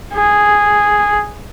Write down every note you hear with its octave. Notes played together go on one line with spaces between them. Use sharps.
G#4